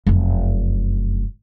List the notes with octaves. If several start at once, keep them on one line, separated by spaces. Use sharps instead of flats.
F1 F#2